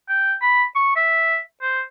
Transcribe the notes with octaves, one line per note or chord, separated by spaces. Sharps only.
G5
B5
C#6
E5
C5